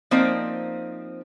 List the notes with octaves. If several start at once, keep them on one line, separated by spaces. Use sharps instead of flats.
F3 A#3 C4 D#4 C5 D5